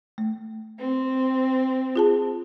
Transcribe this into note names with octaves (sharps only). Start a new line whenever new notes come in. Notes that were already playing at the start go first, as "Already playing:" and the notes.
A3
C4
F4 G#4 A5